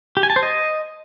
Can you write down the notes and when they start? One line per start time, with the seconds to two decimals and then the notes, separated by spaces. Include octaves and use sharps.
0.17 G4
0.23 G#5
0.30 A5
0.36 C5
0.43 D#5